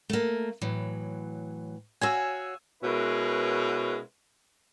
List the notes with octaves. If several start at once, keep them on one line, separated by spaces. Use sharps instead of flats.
A3 A#3
A2 E3 F#3
F#4 C#5 F5 G#5 E6
B2 G#3 C#4 E4 A#4 B4